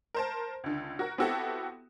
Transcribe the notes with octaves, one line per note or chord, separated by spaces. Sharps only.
A#4 C5 A5
C#2 D3
F#4 A#4
B3 C4 E4 F#4 G4 A4